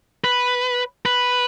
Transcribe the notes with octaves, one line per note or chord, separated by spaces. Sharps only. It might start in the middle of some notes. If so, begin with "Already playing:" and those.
B4
B4